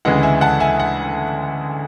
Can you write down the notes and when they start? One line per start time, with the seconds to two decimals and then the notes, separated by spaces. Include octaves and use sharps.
0.05 D2 C#3 E3 G#3 F#5
0.23 E5 G#5
0.41 F#5 A5
0.60 E5 G#5
0.80 F#5